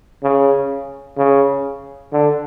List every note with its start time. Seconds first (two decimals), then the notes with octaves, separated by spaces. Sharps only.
0.23 C#3
1.17 C#3
2.12 D3